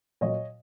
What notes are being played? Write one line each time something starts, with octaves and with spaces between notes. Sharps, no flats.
A#2 F#3 C#5 D#5